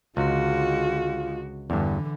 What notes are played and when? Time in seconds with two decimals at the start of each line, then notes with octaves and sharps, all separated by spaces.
0.17 C#2 D3 G#3 F4 F#4
1.70 E2 G2 D3 E3